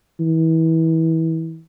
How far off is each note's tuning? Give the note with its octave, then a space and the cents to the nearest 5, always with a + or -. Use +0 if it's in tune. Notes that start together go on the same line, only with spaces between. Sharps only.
E3 -30